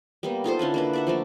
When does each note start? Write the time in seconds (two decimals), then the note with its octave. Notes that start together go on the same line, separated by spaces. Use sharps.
0.23 G3 A#3 B3
0.44 D#4 F4 A4 C5
0.59 D3 C#4 E4 B4
0.74 A#3 D4 B4
0.93 D5 E5 F#5
1.07 F3 A3 A#3